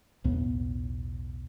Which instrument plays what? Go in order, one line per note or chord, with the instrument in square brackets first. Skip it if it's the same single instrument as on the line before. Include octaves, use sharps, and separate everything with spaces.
[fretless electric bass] B1 E2 A2 B3